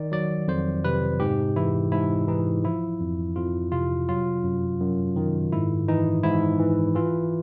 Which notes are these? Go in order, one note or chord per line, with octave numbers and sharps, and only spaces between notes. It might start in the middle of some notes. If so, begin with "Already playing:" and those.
Already playing: D#3 D5
F#3 D5
F2 C5
C3 B4
G#2 G4
E3 E4
G#2 E4
E3 D#4
F3 E4
F2
F2 F4
C3 F4
F#3 F4
F#2
F#2
D#3
G#2 E4
E3 D#4
G#2 E4
E3
E3 F4